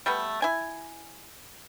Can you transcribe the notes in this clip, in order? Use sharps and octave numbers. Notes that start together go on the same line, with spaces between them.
G3 A3 B3
E4 G#5